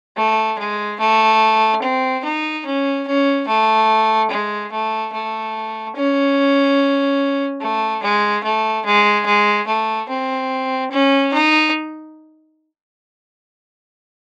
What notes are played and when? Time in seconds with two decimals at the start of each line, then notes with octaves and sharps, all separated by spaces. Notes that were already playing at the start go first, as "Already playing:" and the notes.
0.17 A3
0.59 G#3
1.00 A3
1.82 C4
2.24 D#4
2.66 C#4
3.07 C#4
3.47 A3
4.31 G#3
4.72 A3
5.13 A3
5.96 C#4
7.61 A3
8.03 G#3
8.44 A3
8.85 G#3
9.26 G#3
9.67 A3
10.09 C4
10.91 C#4
11.33 D#4